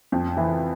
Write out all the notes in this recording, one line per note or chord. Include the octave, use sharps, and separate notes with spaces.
F2
E3